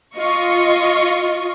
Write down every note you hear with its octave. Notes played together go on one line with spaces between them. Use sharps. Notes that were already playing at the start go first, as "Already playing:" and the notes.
F4 D#5 C#6